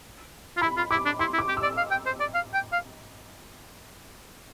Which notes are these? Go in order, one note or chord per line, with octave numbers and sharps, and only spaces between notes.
F4
E4 B5
F4
E4 D6
D4
E4 C6
E4
D6
G4
E6
D5
F5
G5
C5
D5
F5
G5
F5